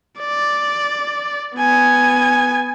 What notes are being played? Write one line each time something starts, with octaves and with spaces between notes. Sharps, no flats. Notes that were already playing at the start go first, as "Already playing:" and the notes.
D5
B3 G#5